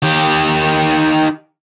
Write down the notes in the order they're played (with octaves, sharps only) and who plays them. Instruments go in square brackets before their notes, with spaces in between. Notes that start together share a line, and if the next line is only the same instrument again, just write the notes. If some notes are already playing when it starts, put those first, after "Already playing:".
[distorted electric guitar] D#3 G4